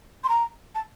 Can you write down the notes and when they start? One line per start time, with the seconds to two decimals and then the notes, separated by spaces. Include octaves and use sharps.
0.24 C6
0.29 A#5
0.75 A5